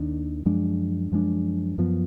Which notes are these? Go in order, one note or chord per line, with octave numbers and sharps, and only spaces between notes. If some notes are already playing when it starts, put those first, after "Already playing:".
Already playing: D#2 D#3 D4
F#2 F3 G#3 D4
F#2 F3 G#3 D4
F#2 F3 B3